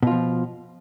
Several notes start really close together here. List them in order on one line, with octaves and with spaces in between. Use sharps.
B2 F4 F3